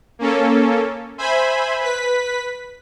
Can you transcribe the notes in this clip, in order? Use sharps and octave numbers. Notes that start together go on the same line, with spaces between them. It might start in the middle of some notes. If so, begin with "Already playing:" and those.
A#3 C#4 A4
C5 E5 G#5 B5
B4 B6